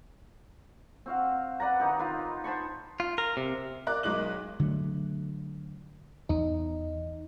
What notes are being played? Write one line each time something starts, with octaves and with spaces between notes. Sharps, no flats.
C4 F#4 F5
B4 D5 F#5 A#5
D#3 D#4 G4
D#4 F4 B4
C5 A5 B5 C#6
F4
A#4
C3
A#4 D5 D6 F#6
B1 G#3 D#4 D6 F#6 F#7
D3 F#3 A3
E2 D#4